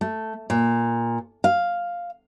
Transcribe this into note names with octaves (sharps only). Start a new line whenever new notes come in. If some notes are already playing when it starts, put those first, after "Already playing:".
A3
A#2
F5